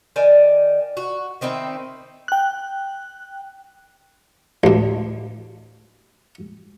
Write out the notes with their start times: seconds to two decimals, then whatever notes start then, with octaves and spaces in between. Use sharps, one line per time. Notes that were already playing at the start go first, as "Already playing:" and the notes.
0.16 D#3 D5 G#5
0.97 F#4
1.41 D#3 C4 D#4 E4
2.28 G5 F#6
4.64 A1 D2